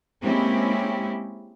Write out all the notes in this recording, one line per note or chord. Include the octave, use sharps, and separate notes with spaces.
G#3 A#3 C4 C#4 E4 G4